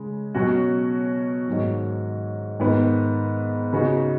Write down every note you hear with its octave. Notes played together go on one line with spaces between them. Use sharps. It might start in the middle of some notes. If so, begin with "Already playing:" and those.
Already playing: C#3 G#3
B2 F#3 C#4 F#4
G#2 D#3 F#3 D#4
G#2 D#3 B3
C#3 B3 D#4 F#4